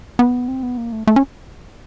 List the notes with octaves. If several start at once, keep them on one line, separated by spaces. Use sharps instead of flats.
B3
C4
B3
A#3
A3
A3
C#4